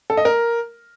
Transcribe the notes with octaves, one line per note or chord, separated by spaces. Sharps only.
A4
D#5
A#4